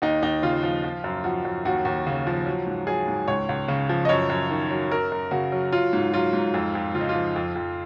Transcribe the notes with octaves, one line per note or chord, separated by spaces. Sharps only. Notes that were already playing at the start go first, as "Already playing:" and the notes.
D#2 D#4
D#2 D#4
C#3 F4
F3
F3
F#2
F3 F#4
F#2
D#2 F#4
D#2
C#3
F3
F#3
G#2
F#3 G#4
G#2
C#2 C#5
C#2
C#3
F3
D#5
F#2 C#5
F#2
D#3
F#3
F#2 A#4
F#2
C#3 F#4
F#3
F#3 F4
G#2
F#3 F4
G#2
F2
F2
C#3 F4
D#4
F4
F3
F2
F2